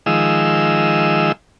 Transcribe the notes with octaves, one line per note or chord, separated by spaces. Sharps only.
D#3 F3 G#3 E6